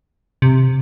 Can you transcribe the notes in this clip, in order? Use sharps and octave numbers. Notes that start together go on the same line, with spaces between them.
C3